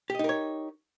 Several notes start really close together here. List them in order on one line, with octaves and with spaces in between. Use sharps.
G4 D#5 D#4 A#4 C#5